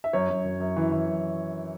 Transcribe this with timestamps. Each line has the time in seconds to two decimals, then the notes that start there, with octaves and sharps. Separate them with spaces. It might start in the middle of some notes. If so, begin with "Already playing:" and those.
0.04 E5
0.13 F#2 C#5
0.29 F#2
0.45 F#2
0.60 F#2
0.76 E3
0.92 E3
1.07 F#2